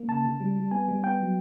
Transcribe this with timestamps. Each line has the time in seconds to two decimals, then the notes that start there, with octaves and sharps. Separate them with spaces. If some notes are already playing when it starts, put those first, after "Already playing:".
Already playing: A#3
0.08 C#3 A5
0.25 C#3
0.40 G3
0.56 G3
0.71 B3 G#5
0.88 G3
1.03 B3 G5
1.20 F#3